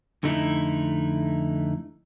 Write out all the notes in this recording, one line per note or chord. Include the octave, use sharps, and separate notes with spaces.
F2 D3 A3 D#4 E4